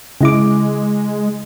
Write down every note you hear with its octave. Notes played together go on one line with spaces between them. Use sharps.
C#3 G#3 E4 D6